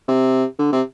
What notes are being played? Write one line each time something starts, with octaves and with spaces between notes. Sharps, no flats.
C3
D3
C3